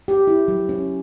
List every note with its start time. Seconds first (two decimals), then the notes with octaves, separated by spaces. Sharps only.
0.08 G4
0.27 E4
0.48 F#3
0.69 C#4